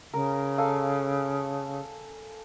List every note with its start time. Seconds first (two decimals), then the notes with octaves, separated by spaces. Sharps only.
0.13 C#3 A#4
0.58 A4 F5 G#5